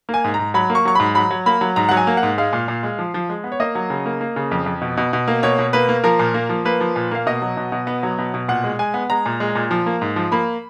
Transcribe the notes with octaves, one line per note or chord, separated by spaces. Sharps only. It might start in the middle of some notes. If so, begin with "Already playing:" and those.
A#3
G#5
G#2
A#5
G#2
F#3 B5
A#3
C#6
F#3 C#6
G#2 B5
F#3 B5
F#3
A#3 B5
F#3
G#2 A#5
F#5
F#3
G#5
A#3
F#5
G#2
G#3 F5
A#2
A#2
G#3
F3
F3
G#3
B3
C#5
A#3 D#5
F#3
C#3
A#3
A#3
C#3
F2
F2
B2
B2
B2
A#3
B2 C#5
B2
A#3 B4
A#3
F3 A#4
A#2
A#3
F3
A#3 B4
F3
A#2
A#3 F5
B2 D#5
F#3
B2
B2
B3
F#3
B2
B2
A#2 F#5
G#3
G#3 G#5
B3
G#3 A#5
A#2
G#3
A#2
F3
A#3
G#2
F3
A#3 B5